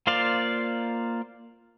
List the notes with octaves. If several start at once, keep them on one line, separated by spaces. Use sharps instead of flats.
A#3 F4 C5 D5 F5